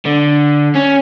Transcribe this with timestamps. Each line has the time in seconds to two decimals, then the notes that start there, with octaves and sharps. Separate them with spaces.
0.05 D3
0.75 C#4